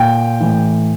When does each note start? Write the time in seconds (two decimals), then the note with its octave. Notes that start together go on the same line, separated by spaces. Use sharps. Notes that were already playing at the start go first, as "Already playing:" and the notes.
Already playing: A#2 G5
0.40 A2 E3